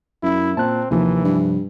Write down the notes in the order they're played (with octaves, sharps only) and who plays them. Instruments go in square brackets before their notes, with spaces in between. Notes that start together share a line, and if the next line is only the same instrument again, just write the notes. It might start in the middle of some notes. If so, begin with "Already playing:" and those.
[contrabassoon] F#2 [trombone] E4
[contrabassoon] A#2 [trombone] C4 [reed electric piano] A5 F#6
[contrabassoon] D#2 [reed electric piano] C3 F3 [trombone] E3
[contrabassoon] G2